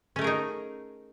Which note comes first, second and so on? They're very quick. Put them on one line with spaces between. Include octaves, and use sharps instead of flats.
C#4 A3 A#4 G#4 D#4